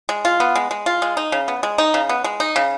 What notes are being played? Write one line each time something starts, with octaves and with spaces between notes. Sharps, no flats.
G#3
F4
B3
G#3
G#3
F4
G#3
D#4
C#3
B3
G#3
D#4
C#3
B3
G#3
D#4
C#3